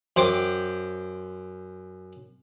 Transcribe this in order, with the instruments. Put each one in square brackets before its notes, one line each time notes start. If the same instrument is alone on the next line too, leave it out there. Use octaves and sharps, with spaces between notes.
[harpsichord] F#2 C5 G5 D6